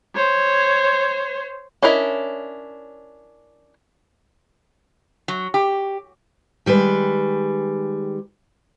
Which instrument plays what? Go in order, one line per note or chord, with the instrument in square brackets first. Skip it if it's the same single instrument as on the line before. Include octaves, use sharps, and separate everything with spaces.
[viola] C5 C#5
[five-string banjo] C#4 D4 E4 A#4 D#5
[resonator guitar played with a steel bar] F#3
G4
[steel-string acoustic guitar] D#3 G3 G#3 B4